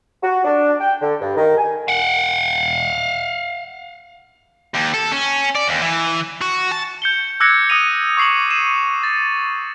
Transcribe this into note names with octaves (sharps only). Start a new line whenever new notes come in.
F#4
D4
G5
D3
G2
D#3
G#5
F5 F#5
D#2
A4
C#4
D5
D#2
E3
F#4
A5
G6 C#7 G7
D6 E6 F#6 G#6 A#6 C#7
D#6 E6 A#6 C#7 D#7 F7
C#6 D6 C7 C#7 F#7
D#7 E7
A6